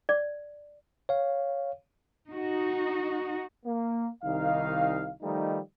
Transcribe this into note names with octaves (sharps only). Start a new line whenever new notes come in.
D5
C#5 F5
D#4 F#4
A#3
C2 D#3 D#4 F5
D#3 F3 G3 A3 D#4